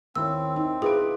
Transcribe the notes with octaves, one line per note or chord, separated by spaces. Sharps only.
D#2 C4 E4 C#5 E6
D#4
E4 F4 G#4 B4 D6 D7